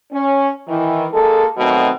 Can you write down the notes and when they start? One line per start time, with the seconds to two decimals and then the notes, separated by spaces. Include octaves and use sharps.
0.12 C#4
0.67 D#3 E3
1.13 G#3 A#3 A4
1.58 B2 D#3 F#3 A3 C4